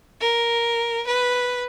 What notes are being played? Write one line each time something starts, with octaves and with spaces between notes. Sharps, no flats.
A#4
B4